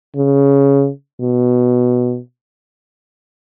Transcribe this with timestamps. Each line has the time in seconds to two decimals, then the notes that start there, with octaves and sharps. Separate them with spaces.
0.16 C#3
1.21 B2